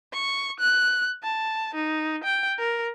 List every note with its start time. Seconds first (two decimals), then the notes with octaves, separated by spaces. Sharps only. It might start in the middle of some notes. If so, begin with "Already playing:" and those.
0.13 C#6
0.60 F#6
1.23 A5
1.75 D#4
2.24 G5
2.59 A#4